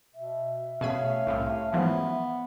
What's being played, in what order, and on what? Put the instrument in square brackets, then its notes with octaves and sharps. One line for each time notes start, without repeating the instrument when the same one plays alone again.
[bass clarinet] B2 [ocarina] E5
[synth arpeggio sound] B2 G#4 B5 [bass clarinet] A3 [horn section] C#4 F5
[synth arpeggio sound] C2 A2 C3
[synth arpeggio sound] G#2 E3 F3 [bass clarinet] B3